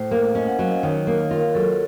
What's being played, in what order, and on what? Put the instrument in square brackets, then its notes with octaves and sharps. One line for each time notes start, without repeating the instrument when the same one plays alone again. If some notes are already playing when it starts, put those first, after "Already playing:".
Already playing: [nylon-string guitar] A2 [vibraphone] C5
[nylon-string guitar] A#3
[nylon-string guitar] C#4 [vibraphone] D#5
[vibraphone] F#5
[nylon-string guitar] F#3 [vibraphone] F5
[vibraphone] D#5
[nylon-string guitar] D#3 [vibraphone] C#5
[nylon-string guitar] A#3
[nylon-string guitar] F4 [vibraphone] A#4
[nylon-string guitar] F#3 [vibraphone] A4